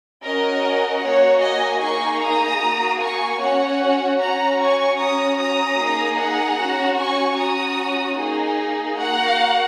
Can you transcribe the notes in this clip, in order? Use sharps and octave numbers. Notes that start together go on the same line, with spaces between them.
C#4 F#4 A#4 D#5
A#3 F#4 C#5 F#5
D#5 G#5
A#3 D#4 G#4 G#5 C#6
A#5 D#6
A#3 F#4
G#5 C#6
C#4 F#4 C#5 F#5
C#4 F#4 F#5 A#5
G#5 C#6
C#4 F#4 A#5 D#6
A#5 D#6
A#3 D#4 G#4
F#5 A#5
C#4 F#4
G#5 C#6
C#4 F#4 A#5 D#6
A#3 D#4 G#4
A#3 F#4 F#5 A#5